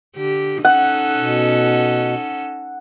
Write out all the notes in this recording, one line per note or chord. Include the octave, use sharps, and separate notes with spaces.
D3 G4
C#4 D#4 A4 F#5
B2